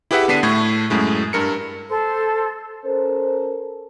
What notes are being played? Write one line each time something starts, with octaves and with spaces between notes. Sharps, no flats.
E4 G4 G#4 B4 E5 F#5
D3 B3 D4 B6 C7 D#7
A2 A3 C#6 G#6
F#2 A2 G#3
G2 A#4 C#7
A4 C5
C#4 A4 A#4 C5